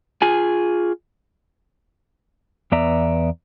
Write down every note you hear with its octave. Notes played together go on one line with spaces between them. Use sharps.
F4 G#4 G#5
E2 B3 D5 E5 A#5